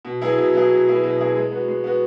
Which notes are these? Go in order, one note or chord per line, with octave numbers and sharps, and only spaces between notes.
B2
F#3 B3 E4 G#4
B2
F#3 B3 E4 G#4
B2
F#3 B3 E4 G#4
B2
F#3 B3 E4 G#4
G#3
B3 F#4
G#3
B3 F#4